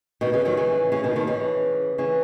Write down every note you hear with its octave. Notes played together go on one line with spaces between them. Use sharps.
B2 D#3
C#3 E3
D#3 F#3
C#3 E3
C#3 E3
B2 D#3
B2 D#3
C#3 E3
C#3 E3